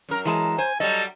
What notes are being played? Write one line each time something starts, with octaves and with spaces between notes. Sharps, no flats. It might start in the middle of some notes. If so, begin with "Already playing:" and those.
F#2 A#4
E3 G#3 A5
C5 G#5
F#3 G3 A4 D#5